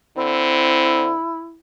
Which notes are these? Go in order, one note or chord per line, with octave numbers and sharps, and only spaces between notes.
D3 C4 E4